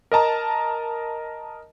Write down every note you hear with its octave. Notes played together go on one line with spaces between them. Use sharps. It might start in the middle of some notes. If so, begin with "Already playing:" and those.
A#4 D#5 A5 A#5